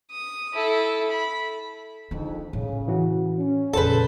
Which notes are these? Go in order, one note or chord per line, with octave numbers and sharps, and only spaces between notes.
D#6
E4 A4
B5
F2 G#2 D#3 D4
A2 C#3
E3 F#4
C#4
F2 A#2 C#3 G#4 A4 B4 C5 A5